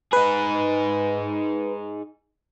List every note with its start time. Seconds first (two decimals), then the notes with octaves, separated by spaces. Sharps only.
0.13 D#4 G#4 B4